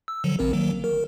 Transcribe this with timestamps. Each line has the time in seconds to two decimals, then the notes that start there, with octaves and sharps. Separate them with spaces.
0.08 E6
0.24 D3 F3 F#3
0.39 A1 C4 A#4
0.53 D#3 F#3 A#3
0.84 A#4